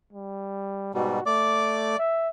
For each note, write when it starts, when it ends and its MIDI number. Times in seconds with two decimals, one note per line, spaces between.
0.13 0.93 55
0.95 1.20 44
0.95 1.20 47
0.95 1.20 55
0.95 1.26 66
1.26 1.97 57
1.26 1.97 74
1.26 1.97 86
1.98 2.29 76